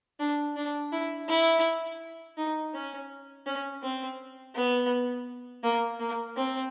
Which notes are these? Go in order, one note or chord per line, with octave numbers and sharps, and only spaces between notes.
D4
D4
E4
E4
D#4
C#4
C#4
C4
B3
A#3
A#3
C4